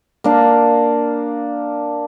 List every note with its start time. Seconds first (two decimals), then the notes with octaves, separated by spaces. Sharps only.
0.24 A#3 D4 F5